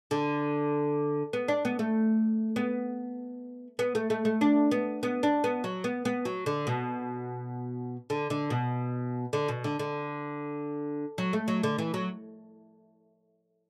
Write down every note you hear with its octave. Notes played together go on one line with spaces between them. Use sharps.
D3
B3
D4
B3
A3
B3
B3
A3
A3
A3
D4
B3
B3
D4
B3
F#3
B3
B3
F#3
D3
B2
D3
D3
B2
D3
B2
D3
D3
F#3
A3
F#3
D3
E3
F#3